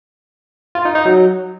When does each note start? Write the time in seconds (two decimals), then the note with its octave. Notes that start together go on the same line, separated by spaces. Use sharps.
0.75 F4
0.85 D#4
0.95 D#4
1.05 F#3